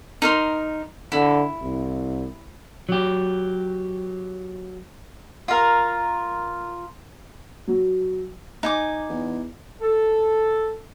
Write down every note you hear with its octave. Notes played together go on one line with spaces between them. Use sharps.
D#4 A#4 C6
D3 E4
C2
F#3 G4
F4 A#4
F#3
D#4 G#5 D6
E2
A4